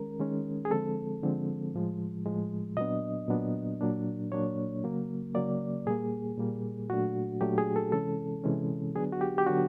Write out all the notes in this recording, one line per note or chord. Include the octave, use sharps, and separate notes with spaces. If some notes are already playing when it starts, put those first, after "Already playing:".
Already playing: D#3 G#3 C#4 A#4
D#3 G#3 C#4
G#4
D3 F3 G#3 C4 A4
D3 F3 G#3 C4
A2 F3 G#3
A2 F3 G#3
A#2 F#3 B3 D4 D#5
A#2 F#3 B3 D4
A#2 F#3 A#3 D4
A#2 F#3 A#3 D4 C#5
C#3 F#3 A#3
C#3 F#3 A#3 D5
A#2 G3 A#3 G#4
A#2 G3 A#3
A#2 F#3 A3 D4 F#4
A#2 F#3 A3 D4 G4
G#4
A4
C3 E3 G#3 C#4 A4
C3 E3 G#3 C#4
D3 F#3 B3 D4 G#4
F#4
G4
G4
D3 F#3 B3 D4 F#4